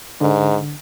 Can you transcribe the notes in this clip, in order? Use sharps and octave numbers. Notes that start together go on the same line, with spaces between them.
G#2 D3